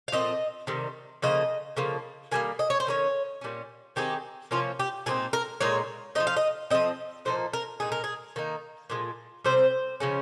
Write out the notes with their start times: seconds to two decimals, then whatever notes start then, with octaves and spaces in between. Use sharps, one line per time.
0.08 F5
0.12 A#2 F3 C4 D#5
0.67 C3 D#3 G3
1.22 C#3 F3 A#3 D#5
1.77 C#3 F3 A#3
2.31 D#3 G3 A#3 G#5
2.59 D#5
2.70 C#5
2.80 C5
2.87 D#3 A#3 C#4 C#5
3.41 A#2 G3 C#4
3.96 D#3 G#3 C4 D#4 G4
4.51 C3 F3 A#3 C#4 F4
4.79 G4
5.06 A#2 G#3 C4 D#4 G#4
5.33 A#4
5.61 A#2 G#3 D#4 C#5
6.15 F3 C4 D#4 D#5
6.27 F5
6.37 D#5
6.70 F3 G#3 C4 D#5
7.25 A#2 F3 A#3 D#4 C5
7.53 A#4
7.80 A#2 G#3 D#4 G#4
7.92 A#4
8.04 G#4
8.36 D#3 A#3 D#4
8.90 A#2 F3 G#3
9.44 C3 G3 C4 C5
10.00 C#3 F3 G#3 C#4